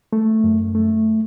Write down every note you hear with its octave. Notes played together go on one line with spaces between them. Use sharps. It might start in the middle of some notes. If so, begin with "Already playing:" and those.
A3
F#2
A3